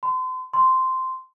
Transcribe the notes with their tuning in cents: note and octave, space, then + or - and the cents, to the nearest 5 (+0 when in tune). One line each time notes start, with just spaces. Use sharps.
C6 -35
C6 -10